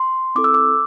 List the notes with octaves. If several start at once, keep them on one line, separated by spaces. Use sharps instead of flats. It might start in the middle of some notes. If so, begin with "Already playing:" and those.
Already playing: C6
C4 E4 A4 D6
E6
D6